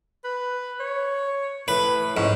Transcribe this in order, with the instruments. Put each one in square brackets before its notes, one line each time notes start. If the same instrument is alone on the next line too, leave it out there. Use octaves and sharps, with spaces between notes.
[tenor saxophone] B4
C#5
[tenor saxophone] A2 [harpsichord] B4
[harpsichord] G#2 [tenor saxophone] C#4